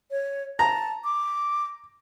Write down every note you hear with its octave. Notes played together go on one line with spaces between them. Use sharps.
C#5
A5 A#5
D6